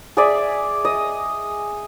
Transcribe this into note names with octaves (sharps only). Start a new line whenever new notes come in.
G#4 D5 E5
D#5